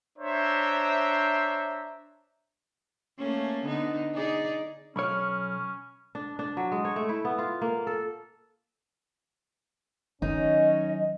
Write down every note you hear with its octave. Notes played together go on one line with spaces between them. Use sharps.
D4 C5 C#5 E5 A#5
A3 A#3 C#4
D3 B3 D#4
D#4 G#4 D5
B1 C#4 C#5 B5 C#6 F6
D4
D4
F#3
G#3
C#5
A3
E4
B3
F4
A#3
A4
D#3 F#3 C#4 D#4 D#5